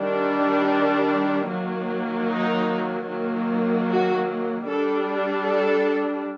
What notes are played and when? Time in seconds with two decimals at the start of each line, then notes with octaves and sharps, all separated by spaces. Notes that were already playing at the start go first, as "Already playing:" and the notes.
Already playing: D#3 G3 D4
1.50 D#3 F#3 A#3
2.29 D#4
3.08 D#3 F#3 A#3
3.87 F#4
4.67 G3 D4 A4
5.46 A4